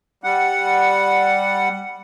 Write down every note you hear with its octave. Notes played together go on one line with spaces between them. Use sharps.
G3 F#5